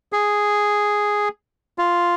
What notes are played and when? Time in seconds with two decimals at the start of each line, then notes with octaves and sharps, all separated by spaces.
0.13 G#4
1.78 F4